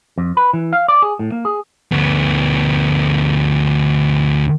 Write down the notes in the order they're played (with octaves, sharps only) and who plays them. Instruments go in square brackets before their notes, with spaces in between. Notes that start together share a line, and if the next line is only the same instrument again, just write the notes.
[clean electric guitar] F2
B4
E3
F5
D5
G#4
A2
A#3
G#4
[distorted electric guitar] D2 B3